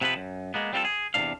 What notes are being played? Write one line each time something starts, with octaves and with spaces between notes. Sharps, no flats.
C3 F3 B3 C4 E4 B4
F#2
G#3 A#3 B3
G3 C4 F4 F#4 A4
G#4
E2 C3 E3 G#3 D4 F5